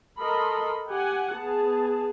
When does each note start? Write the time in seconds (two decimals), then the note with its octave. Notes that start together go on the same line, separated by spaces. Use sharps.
0.19 A4 A#4 D#5 B5 C6
0.91 G4 F#5 G#5
1.38 B3 G#4 A5